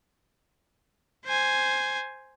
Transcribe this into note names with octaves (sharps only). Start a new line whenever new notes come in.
C5 G#5